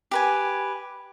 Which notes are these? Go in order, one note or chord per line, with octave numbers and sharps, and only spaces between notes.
G4 B4 G#5